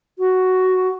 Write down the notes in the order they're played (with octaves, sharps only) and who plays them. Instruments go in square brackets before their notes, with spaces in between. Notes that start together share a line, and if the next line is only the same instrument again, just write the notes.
[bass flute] F#4